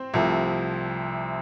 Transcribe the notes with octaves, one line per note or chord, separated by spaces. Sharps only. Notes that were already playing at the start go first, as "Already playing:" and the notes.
Already playing: C4 C5
C2 C3 F3 A3